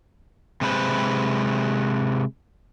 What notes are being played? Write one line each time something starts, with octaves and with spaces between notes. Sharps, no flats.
C3 G#3 B4 C5